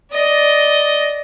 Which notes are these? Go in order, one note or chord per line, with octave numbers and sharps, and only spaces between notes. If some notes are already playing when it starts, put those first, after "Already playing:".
D5 D#5